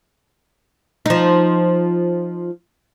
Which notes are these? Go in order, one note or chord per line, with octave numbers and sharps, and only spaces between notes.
F3 D#4